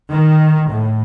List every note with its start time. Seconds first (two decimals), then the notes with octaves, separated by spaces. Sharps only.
0.11 D#3
0.72 A2